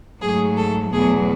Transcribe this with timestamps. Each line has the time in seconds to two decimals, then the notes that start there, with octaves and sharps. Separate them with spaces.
0.22 G#2 F#3 A3 G#4
0.57 A4
0.93 E2 B2 F#3 A3 G#4